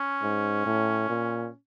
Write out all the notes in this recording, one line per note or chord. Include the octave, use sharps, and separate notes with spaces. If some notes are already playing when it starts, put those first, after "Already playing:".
Already playing: C#4
G#2
A2
A#2